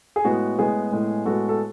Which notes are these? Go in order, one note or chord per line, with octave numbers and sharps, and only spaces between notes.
G#4
A2 G#3 B3 F#4
A2 G#3 B3 G#4
A2 G#3 B3
A2 G#3 B3 F#4 A4
A4